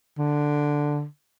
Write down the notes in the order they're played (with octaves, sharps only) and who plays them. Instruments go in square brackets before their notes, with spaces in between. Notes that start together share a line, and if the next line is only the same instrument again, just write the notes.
[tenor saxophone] D3